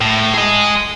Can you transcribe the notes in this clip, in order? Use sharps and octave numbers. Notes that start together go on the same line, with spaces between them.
A2
G#4 D#5